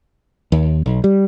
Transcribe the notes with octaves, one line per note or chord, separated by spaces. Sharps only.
D#2
B1
G3